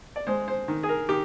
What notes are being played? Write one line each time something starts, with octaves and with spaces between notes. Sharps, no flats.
D5
G#3 C5
C5
D#3
G#4
A#4
D#3 G4